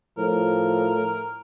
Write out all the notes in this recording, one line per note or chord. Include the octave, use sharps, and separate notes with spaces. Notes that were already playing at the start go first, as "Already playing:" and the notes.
A2 F3 A#4